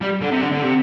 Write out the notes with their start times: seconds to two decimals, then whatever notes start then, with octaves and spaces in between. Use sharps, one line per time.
0.01 G3
0.21 D3
0.31 C3
0.41 D3
0.51 D3
0.62 C3